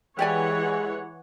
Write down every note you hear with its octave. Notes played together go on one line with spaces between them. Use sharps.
E3 G#3 G4 C#5 D5 F#5 G#5